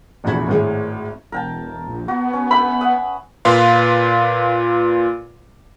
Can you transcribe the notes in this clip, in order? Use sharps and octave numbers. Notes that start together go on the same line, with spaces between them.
F1 A#1 E2 F#4 B5 G#6
G#1 A2 G#4 C#5
E1 A#4 G5 A5
A#1
B3 F#4
B3 C#4
B4 E5 G5 B5
E5 F#5 D#6
A#2 F4 B4 F5 C6